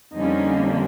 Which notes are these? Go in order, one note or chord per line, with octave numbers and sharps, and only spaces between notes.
F2 D3 G3 A#3 C#4 D#4